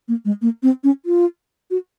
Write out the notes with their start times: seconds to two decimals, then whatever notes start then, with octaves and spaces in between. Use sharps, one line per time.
0.08 A#3
0.25 G#3
0.42 A#3
0.63 C4
0.84 C#4
1.06 F4
1.71 F#4